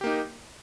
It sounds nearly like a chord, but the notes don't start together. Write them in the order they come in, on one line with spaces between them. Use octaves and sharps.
G4 A#3 D#4